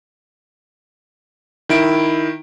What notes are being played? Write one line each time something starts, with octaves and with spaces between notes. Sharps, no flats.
D#3 E4 D7